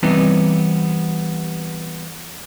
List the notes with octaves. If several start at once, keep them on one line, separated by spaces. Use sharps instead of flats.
E3 G3 B3 C4 D#4